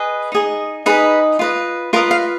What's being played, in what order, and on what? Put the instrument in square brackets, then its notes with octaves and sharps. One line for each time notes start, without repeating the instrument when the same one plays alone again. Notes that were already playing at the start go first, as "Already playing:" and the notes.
Already playing: [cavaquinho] G#4 B4 D#5
D#4 G#4 D#5
D#4 G#4 B4 D#5 B5
F4 B4 D#5
F4 A#4 B4 D#5 A#5
F5